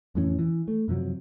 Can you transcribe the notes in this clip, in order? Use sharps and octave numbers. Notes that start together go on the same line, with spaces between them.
F2 A2 E3 C#4
E3
A3
F#2 C3 F3 F#3